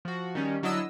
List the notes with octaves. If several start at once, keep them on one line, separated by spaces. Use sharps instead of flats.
F3 F#4
D#3 G3 C#4
D3 F#3 D4 E4 D#5 E6